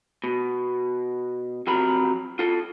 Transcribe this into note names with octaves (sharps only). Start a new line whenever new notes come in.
B2
F2 C3 F#3 A#4 B5
F4 A4